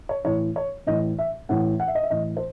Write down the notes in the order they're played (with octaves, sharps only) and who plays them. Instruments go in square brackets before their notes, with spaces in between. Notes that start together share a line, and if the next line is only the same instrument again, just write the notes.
[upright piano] C#5
A2 E3 C#5
C#5
A2 E3 D#5
E5
A2 E3 F#5
F#5
E5
D#5
E5
A2 E3 D#5
C5